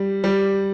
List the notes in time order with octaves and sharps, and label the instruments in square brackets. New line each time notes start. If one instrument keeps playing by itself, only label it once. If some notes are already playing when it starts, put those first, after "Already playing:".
Already playing: [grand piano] G3
G3